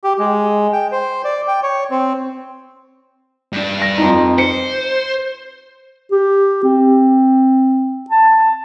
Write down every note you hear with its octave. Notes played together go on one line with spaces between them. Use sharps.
G4
G#3
G5
C5
D5
G5
C#5
C4
G2 D4
A#6
F2 D#4
C5 C#7
G4
C4
A5